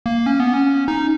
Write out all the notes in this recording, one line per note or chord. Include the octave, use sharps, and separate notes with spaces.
A#3
C#4
B3
C#4
D#4